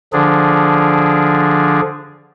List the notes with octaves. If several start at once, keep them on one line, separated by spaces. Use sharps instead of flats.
D3 F3 D4 G#4